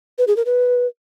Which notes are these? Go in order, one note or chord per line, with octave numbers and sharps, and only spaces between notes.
B4
G#4
A#4
B4